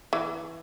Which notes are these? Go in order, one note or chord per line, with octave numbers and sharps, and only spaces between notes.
E3